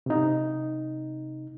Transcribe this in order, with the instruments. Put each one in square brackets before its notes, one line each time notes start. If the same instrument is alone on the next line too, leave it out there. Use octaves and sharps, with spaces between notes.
[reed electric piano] C3 D#4